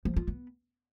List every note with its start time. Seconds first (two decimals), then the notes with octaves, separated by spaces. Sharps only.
0.05 F3
0.17 F4
0.28 B3